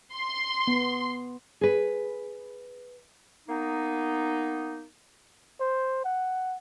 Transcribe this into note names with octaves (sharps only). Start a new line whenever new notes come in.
C6
B3
G#4 B4
A#3 B3 D#4
C5
F#5